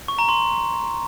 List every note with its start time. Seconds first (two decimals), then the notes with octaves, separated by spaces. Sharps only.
0.08 C#6
0.19 A#5
0.29 C6